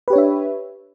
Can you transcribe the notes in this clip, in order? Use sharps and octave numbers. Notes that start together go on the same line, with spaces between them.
D4 G4 B4 C#5 E5